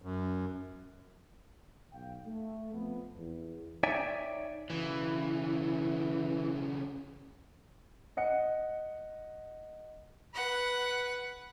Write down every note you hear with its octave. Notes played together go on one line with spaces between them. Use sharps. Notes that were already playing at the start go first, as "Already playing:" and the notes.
F#2
B1 F5 G5
A3
F2 F3 B3
E2
D#4 C#5 D5 E5 G5 G#5
B1 C#3 E3
D#5 F#5 C#7
B4 F#5